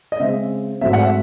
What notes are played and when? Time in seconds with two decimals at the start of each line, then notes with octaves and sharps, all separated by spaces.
0.12 D#5
0.20 C#3 G#3 C4 E5
0.81 G#2 F#3 A3 C4 E5
0.93 F#5
1.04 E5